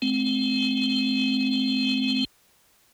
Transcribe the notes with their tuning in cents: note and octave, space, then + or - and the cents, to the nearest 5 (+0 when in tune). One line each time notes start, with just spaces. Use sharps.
A3 -45 C4 +0